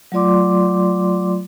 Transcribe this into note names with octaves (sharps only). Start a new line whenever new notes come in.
F#3 A3 F4 D5 C6 D6